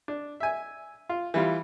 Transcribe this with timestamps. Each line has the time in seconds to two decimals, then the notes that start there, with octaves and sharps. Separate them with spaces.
0.08 D4
0.40 E5 G#5
1.09 F4
1.34 E3 G3 F4